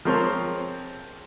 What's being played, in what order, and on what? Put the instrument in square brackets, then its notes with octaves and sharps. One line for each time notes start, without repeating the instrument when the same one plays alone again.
[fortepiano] F3 G#3 C4 A#4 C#5